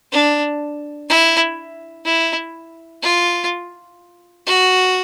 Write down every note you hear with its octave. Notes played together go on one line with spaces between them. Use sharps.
D4
E4
E4
F4
F#4